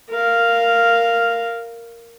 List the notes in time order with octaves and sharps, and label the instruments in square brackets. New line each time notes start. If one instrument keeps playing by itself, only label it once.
[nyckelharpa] A#4 F5